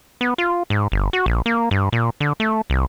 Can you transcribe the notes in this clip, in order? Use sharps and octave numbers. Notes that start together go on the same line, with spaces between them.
B3
F4
G#2
G1
F#4
A#1
A#3
G2
A#2
D3
A3
C2